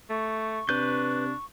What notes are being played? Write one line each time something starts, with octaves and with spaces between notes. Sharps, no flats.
A3 C#6
C3 D4 B4 G6